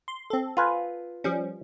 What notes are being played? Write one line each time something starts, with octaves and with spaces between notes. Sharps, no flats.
C6
C4 A4
F4 B4 G#5
F3 G3 C#4